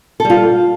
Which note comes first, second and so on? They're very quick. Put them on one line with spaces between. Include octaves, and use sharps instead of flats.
A4 G3 F4